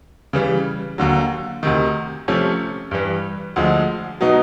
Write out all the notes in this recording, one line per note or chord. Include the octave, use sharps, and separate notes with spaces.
C#3 E3 G3
D#2 D3 F#3
D2 C3 D#3
C3 F3 A3 C#4
G2 E3 G3
D2 D3 F3 G#3
B2 F#3 B3 D#4